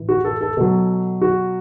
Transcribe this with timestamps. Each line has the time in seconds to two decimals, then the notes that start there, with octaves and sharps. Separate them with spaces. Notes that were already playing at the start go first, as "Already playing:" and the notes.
Already playing: A2 E3
0.09 F#4
0.24 A4
0.41 A4
0.57 B2 F#3 A4
1.22 F#4